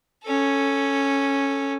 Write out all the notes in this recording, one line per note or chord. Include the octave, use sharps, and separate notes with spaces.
C#4 A4